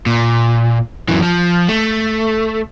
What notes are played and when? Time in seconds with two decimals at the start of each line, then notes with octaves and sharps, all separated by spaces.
0.06 A#2
1.08 F#2 E3
1.22 F3
1.68 A3